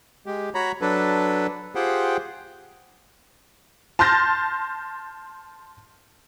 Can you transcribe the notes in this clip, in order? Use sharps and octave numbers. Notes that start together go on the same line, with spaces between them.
G#3 G4
F#4 C#5 A#5 B5
F#3 D4 A4 B4
F4 G4 G#4 C5 F#5 G5
A5 C6 F6 G6 A6 A#6